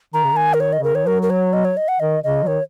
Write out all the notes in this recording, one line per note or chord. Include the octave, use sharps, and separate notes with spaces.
D#3 A#5
C#3
D#3 G#5
A#4
C#5
D#5
C#3 A#4
D#3 C#5
F#3 A#4
A#4
C#5
D#5
C#5
D#5
F#5
D#3 D#5
C#3 D#5
F#3
D#3 C#5